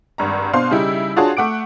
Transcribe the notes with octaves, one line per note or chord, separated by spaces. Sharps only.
G#1 G2 A#5
B2 D4 C5 F5 C6
C#3 G3 D#4 E4
D4 F4 F#4 G#4 C#5 A5
A3 F#5 D6 D7